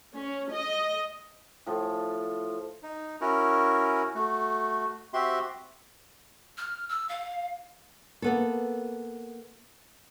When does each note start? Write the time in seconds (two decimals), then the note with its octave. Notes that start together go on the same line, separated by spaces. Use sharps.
0.15 C#4
0.52 D#5
1.66 A2 F3
2.83 D#4
3.21 C#4 E4 F#4 A#4
4.15 A3 F#4
5.13 C4 F#4 G4 E5 C6
6.57 F6
6.89 E6
7.09 F5
8.22 A#3 B3 A4